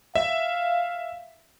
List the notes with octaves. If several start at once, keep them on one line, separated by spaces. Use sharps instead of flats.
E5 F5